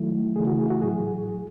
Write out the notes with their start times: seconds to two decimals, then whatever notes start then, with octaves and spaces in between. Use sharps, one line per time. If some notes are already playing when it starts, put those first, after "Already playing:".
Already playing: D#3 F#3 A3 E4
0.36 C#3 E3 A3 E4 G#4
0.47 F#4
0.59 G#4
0.70 F#4
0.82 A2 F#3 G#4